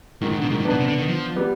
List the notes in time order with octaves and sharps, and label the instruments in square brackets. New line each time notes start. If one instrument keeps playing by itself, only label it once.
[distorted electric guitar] G#2 [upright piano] D#3
[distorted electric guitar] G#2
[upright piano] D3
[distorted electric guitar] B2
[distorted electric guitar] G#2 [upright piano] D#3
[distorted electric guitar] G2
[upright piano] B3 D4
[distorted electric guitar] B2
C3
D3
D#3
F3
[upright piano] G3 B3